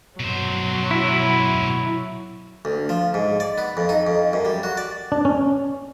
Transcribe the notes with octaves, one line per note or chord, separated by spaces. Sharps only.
B2 F#3 C5
E4
D2
F3
G#2
D5
B3
F2
D#4
F2
F#2
G3
F#4
D5
D4
C#4